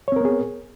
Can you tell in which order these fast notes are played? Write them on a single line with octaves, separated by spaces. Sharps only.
C#5 C4 A#4 B3 G#4